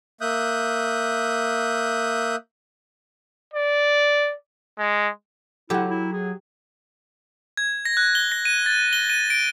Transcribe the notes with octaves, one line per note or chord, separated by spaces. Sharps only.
A#3 E5 D#6 F#6 G6
D5
G#3
F#3 E4 G4 A4 F#5
E4
G#4
G#6
A#6
F#6
G7
A#6
D#7
A6
G7
D#7
D7